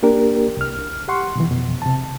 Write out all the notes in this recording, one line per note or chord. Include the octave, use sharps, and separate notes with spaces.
A#3 D4 G4 A#4
C2 F6
G4 F#5 C6 C#6
B2 D#3 E3
F2 B2
C3 A5